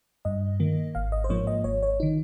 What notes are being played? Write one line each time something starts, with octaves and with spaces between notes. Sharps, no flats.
G2 D#5
D#3 A#3
G#1 F5
D#5
C5
G#2 F3 A#3 C#5
D#5
G#1 C#5
C#5
D#3 D#4